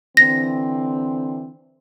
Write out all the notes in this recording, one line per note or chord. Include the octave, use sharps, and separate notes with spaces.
D3 E3 C4 A#6